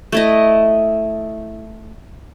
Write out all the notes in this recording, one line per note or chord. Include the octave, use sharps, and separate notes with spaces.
A3 E4 D#5